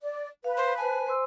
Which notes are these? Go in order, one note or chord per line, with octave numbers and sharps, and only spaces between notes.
D5
B4 F5
C5
C5 G#5 A5
C5 C6 E6